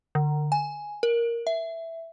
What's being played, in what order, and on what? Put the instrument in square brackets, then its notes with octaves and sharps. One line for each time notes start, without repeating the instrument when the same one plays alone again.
[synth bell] D3
G#5
A#4
E5